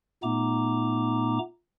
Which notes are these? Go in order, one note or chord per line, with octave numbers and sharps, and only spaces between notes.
A#2 A3 B3 D#4 A#5 D6